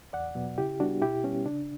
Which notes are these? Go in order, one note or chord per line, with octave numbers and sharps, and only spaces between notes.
E2 D5 F#5
B2 F#3 B3
C#3 E4 G4
G3 B3 D4 F#4
B2 E4 G4
G3 B3 C#4
C#3 D4